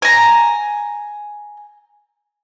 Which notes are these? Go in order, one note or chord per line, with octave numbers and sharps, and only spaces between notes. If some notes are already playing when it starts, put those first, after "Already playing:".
G#5 A#5